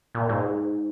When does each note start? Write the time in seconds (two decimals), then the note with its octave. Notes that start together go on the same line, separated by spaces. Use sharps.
0.15 A#2
0.29 G#2